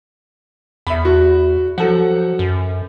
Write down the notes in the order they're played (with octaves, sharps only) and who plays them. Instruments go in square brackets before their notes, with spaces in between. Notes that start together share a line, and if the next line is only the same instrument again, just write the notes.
[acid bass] E2 [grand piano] E5 B5
[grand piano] F#4
[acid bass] F3 [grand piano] F#3 A4 F#5
[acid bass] F#2